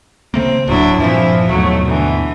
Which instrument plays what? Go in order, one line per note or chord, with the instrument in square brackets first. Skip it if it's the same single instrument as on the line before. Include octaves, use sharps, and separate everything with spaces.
[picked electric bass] C#3 A3 A#3 [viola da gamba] C4
[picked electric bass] D1 A2 [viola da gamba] F#3 D4 E4
[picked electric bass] G2 A#2 C4 [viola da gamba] E3 F3 E4
[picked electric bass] D#2 G#2 B2 [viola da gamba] F#3 A3
[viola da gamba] D3 E3